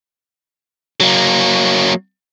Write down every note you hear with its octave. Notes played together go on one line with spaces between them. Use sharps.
F#3 A#3